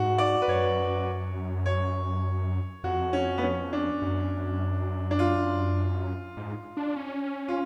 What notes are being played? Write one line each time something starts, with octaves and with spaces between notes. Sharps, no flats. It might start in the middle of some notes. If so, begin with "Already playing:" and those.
Already playing: G#2 F#4
D5
B4
F#2 C#5
C#5
F2 F#4
C#4
B3
C#4
D4
F#2
D4
F4
G#2
D4
C#4
F4